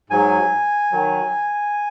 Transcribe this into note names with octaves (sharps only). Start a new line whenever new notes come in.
G#2 F#3 G#5
D#3 F#3